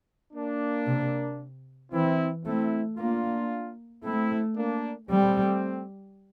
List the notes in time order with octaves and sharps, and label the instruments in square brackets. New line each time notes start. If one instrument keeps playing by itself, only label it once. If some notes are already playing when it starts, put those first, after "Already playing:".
[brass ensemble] A#3 D4
[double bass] C3
[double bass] E3 [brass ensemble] C4 E4
[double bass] A3 [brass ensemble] C4 E4
[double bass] A#3 [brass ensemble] D4 F4
[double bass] A3 [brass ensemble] C4 E4
[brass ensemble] A#3 D4
[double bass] G3 [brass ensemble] A3 C4